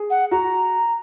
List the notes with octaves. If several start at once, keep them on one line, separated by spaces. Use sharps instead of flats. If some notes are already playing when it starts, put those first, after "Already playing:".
Already playing: G#4
F#5
F#4 A#5